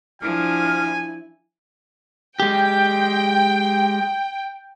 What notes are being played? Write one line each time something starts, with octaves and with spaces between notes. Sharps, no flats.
F3 D4 E4 G#5 F6
G#3 G4 G5